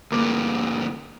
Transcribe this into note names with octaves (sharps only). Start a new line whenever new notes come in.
D2 G2 A#3 D6